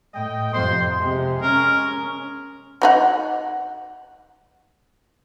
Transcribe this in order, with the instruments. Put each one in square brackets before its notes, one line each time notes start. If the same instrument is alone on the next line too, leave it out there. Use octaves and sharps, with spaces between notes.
[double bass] A2 [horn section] D#5 G5
[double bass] F2 C3 [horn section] C5 C6
[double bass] C3 [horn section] G#3
[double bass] C#4 [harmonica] A#4
[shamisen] F#3 D#4 F#5